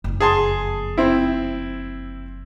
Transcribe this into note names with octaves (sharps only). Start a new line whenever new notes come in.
F#1 F2
G#4 A5 C6
C4 E4